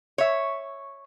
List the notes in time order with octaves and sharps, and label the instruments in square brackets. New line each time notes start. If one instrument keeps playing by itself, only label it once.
[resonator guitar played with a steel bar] C#5 E5